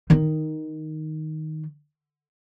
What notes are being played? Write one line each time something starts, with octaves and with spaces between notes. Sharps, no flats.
D#3 D#4